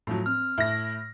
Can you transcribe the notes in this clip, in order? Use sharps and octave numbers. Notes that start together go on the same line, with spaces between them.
A2 F3 F#3
C4 F6
A2 E4 A#6